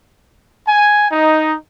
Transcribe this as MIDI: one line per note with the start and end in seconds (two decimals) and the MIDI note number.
0.68 1.08 80
1.12 1.55 63